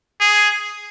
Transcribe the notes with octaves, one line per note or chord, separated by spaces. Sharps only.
G#4